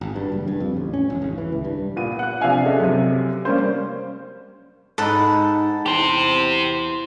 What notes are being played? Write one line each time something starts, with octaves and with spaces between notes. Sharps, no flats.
G#1
G2
F#1
G2
F2
A1
C#4
E1
G#1
E3
C#2
G2
A#2 B3 D#7
F#5 F#6
C3 F3 D4 E5 F5 G#5
C#4 G#4 A4 D#5 E5
F#2 C3
G3 A#3 C#4 C5
G#2 D#4 A4 F#5 B5
E2 G4 C5